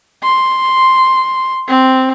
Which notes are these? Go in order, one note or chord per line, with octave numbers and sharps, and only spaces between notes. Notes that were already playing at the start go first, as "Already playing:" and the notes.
C6
C4